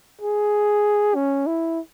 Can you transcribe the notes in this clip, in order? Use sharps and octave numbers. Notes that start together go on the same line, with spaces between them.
G#4
C#4
E4